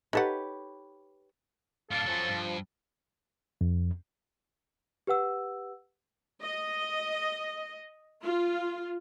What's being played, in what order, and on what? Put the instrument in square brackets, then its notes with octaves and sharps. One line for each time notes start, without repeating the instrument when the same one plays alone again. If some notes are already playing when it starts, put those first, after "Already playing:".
[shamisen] D#4 A4 F#5 [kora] G4 B4 C#5
[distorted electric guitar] A2 D4 [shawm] A4 [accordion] F5
[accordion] F3 [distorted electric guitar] F#3 C#4
[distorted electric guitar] G2
[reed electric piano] F2
[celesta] G4 B4 F#5 E6
[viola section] D#5
F4